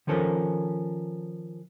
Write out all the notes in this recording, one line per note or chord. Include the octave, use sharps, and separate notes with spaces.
D#3 F3 C#4 A4 A#4 C5